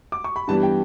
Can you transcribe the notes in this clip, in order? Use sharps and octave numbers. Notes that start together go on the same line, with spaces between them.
D6
C#6
B5
G2 E3 G3 B3 A5
G5